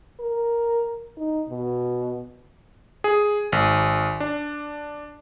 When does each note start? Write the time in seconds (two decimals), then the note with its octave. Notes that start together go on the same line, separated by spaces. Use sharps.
0.20 A#4
1.17 D#4
1.49 B2
3.04 G#4
3.52 G#1
4.20 D4